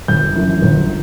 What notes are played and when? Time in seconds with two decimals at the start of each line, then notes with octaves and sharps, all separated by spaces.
0.08 G1 G6
0.35 F#2 E3
0.62 G1